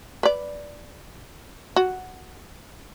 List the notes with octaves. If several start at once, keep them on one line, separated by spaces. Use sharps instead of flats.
B4 D5
F#4